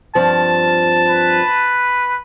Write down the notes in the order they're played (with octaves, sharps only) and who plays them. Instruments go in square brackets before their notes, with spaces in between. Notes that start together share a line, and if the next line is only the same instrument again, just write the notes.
[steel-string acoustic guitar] G2 F3 C4 [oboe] A5
[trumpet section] B4